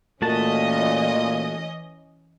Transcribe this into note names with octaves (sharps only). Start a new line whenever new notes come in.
A#2 E3 A3 C#4 F#4 D#5 A5